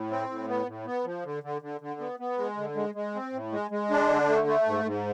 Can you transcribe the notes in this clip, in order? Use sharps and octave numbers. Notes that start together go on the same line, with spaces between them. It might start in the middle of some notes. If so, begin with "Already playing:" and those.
Already playing: A2
C4
A2
B3
A2
B3
F3
D3
D3
D3
D3
B3
B3
G#3
D3
G#3
G#3
C4
A2
G#3
G#3
D4
D3
A3
A3
G#2
G#2